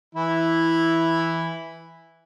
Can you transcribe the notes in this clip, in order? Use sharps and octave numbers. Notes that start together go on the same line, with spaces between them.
E3 E4